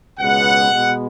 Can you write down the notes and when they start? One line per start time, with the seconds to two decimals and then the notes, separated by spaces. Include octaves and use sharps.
0.18 C#2 B2 G#3 B3 F#5
0.71 B2 G#3 B3